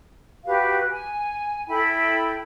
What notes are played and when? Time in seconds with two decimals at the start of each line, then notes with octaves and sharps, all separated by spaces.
0.45 F#4 G4 B4 F5
0.90 G#5
1.69 E4 A4 G5 B5